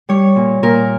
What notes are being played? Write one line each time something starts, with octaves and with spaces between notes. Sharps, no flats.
G3 C#5
A#2
A#2 A#4